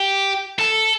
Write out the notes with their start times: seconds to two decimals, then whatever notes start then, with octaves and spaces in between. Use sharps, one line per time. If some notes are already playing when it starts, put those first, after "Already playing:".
Already playing: G4
0.59 A4